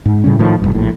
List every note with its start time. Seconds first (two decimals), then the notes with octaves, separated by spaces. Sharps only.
0.06 G#2
0.24 A2 C#3 G3 C#4
0.39 A2 D#3 F3
0.62 F1 E2 G2
0.75 A#1 A2